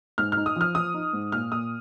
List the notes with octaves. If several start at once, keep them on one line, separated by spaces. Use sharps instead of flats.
G#2 F6
F6
D#4
D#6
F3 F6
F3 D#6
D#4
G#2
A#2 F6
A#2 D#6